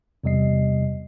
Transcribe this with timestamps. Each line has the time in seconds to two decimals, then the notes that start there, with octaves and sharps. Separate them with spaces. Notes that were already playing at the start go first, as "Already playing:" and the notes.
0.24 E2 C3 G3 D#5 C7